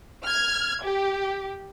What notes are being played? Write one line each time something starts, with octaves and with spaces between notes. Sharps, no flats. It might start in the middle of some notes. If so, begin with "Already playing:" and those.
F6 G#6
G4